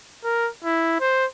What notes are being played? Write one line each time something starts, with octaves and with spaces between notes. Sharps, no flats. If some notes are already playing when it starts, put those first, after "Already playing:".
A#4
E4
C5